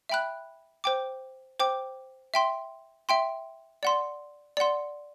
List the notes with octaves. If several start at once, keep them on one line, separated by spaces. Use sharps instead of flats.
E5 G5 B5 F#6
C5 G5 D6
C5 G5 D6
E5 G5 C6
E5 G5 C6
D5 F#5 C6
D5 F#5 C6